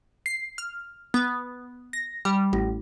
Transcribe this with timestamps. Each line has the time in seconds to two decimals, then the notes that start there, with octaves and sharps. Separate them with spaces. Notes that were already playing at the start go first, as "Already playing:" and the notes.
0.26 C7
0.58 F6
1.14 B3
1.93 A#6
2.25 G3
2.53 A1